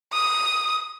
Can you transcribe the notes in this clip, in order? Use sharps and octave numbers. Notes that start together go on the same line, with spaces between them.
D#6